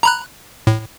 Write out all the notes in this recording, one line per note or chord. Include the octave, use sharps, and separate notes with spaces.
A#5 B5 F#6
A2